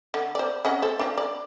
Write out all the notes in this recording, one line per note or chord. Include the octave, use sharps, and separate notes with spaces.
D3
C5 D5
C#4 D#5 F#5
A4 C5
F3 D4
D5